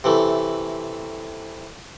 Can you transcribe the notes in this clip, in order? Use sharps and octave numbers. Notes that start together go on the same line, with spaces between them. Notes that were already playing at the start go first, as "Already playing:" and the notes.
C3 E3 A3